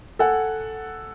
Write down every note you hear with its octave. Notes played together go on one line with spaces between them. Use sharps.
A4 F#5 G#5